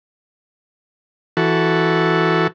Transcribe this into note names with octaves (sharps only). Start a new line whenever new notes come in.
E3 F#4 A4